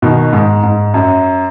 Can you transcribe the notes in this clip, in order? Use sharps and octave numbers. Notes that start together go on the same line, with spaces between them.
B2 D#3
G#2
G#2
F#2